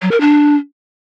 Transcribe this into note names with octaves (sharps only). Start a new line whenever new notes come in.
F#3
A#4
D4